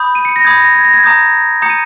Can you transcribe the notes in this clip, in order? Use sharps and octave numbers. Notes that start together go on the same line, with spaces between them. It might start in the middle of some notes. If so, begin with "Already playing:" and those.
Already playing: B5 D#6 G6
D#7
C#7
A#6
B5 D#6 G6 G#6
A#6
G#6
A#6
G#6
A#5 D#6 G6 A#6
A#5 D#6 G6 C#7
D#7